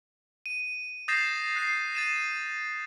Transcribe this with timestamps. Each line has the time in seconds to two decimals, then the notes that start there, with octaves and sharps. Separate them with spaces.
0.46 D#7
1.08 D#6 G6 A6 A#6 C7 E7
1.56 F#6 A#6 C7
1.95 A6 D#7 E7